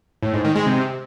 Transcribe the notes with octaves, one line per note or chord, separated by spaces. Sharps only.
A2
G#2
D#3
G#3
C3